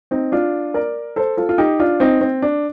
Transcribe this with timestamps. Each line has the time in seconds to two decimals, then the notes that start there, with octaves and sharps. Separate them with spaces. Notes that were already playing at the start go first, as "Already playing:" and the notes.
0.11 C4 D#4
0.32 D4 F4
0.74 A#4 D5
1.16 A4 C5
1.37 F4 A4
1.49 F4
1.58 D#4 G4
1.79 D4 F4
2.00 C4 D#4
2.21 C4
2.42 D4